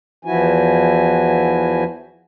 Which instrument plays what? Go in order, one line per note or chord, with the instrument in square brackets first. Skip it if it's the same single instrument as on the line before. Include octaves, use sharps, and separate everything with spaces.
[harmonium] E2 E3 F3 E4 F#4 G#5